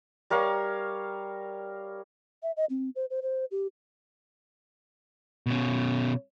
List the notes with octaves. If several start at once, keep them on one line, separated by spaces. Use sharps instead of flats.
G3 A#4 C#5 F5
E5
D#5
C4
C5
C5
C5
G4
B2 C#4